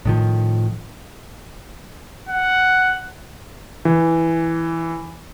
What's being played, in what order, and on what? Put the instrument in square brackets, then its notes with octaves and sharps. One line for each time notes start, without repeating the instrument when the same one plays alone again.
[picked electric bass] A2 D#3 F3
[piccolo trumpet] F#5
[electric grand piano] E3